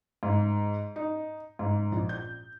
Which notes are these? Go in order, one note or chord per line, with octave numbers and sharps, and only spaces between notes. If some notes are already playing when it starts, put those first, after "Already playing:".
G#2
D#4
G#2
A#1
G6